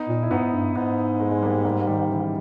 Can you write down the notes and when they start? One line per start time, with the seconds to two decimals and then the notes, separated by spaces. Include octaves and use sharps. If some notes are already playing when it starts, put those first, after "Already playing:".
Already playing: B3 D#4
0.08 A#2
0.23 E4
0.31 G#2 B3 D#4
0.53 G2
0.75 G#2 B3 D#4
1.20 G#3 B3
1.31 G#3
1.42 G3 A#3
1.65 G3 A#3
1.87 D#3 G3
2.09 C#3 E3